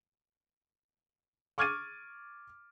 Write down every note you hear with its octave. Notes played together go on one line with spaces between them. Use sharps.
C#6 D6 F6 G#6 A6 D#7